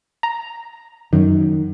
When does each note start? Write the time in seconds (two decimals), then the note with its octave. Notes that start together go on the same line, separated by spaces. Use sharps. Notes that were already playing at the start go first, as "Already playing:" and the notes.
0.23 A#5
1.13 F#2 D#3